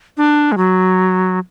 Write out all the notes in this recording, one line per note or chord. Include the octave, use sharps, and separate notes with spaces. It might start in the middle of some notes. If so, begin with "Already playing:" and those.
D4
G#3
F#3